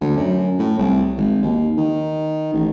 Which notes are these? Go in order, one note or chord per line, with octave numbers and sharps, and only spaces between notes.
D2
F#2
A2
C2
G#1
D#2
D#3
A1